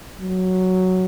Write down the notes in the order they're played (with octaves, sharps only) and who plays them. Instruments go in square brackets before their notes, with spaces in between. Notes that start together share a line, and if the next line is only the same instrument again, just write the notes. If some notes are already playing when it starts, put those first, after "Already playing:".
[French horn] F#3